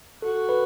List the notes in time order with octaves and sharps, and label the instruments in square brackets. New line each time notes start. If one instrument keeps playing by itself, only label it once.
[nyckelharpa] F#4 [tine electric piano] A4
[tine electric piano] B4